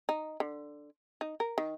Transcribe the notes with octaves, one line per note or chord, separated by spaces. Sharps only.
D#4
D3
D#4
A#4
D#3